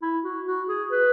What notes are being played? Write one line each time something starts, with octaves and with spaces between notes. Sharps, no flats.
E4
F#4
F#4
G#4
B4